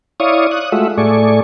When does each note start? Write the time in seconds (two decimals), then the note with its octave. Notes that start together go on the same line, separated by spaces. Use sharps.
0.20 E4 C#5 D5 F5 C#6 D#6
0.51 D#6 F#6
0.72 G#3 A3 F4 F#4 E5
0.98 A2 A3 G#4 D5 C#6